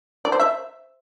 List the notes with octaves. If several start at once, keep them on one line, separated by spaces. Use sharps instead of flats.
D5
C5
E5